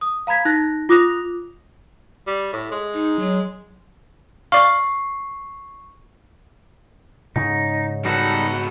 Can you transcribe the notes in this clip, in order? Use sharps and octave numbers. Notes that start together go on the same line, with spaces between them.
D#6
F5 A#5 B5 G#6 B6
D#4 F#6 A#6
F4 D6 D#6 F#6 A#6 F7
G3
A2
G#3
D#4
F#3
D5 F5 C#6 C7
G#2 C#3 D#4
B2 G3 D#4 A4 B4 F#5